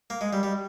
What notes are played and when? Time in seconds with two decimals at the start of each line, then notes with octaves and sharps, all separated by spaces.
0.10 A#3
0.21 G#3
0.33 G3
0.43 G3